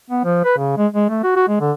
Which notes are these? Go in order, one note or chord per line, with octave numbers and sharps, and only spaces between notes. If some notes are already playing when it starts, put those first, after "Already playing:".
B3
F3
B4
C#3
G#3
G#3
A3
F#4
F#4
G#3
D3